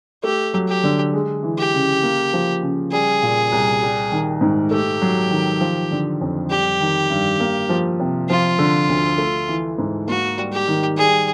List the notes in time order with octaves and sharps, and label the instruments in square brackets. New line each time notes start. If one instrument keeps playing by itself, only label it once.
[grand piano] A3 [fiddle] G4
[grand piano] F#3
[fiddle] G4
[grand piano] D3
G#3
E3
[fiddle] G4
[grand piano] C#3
A#3
F3
C#3
[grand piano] G3 [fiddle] G#4
[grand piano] A#2
C2
G3
D#3
G#2
[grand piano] A3 [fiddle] G4
[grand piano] F#3
D#3
F3
D3
F2
[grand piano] G3 [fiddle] G4
[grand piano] D#3
G2
A#3
F3
C3
[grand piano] F3 [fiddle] F4
[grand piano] D3
D2
A3
E3
G#2
[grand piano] A#3 [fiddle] F#4
[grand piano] G3
[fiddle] G4
[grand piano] D#3
[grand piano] G3 [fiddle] G#4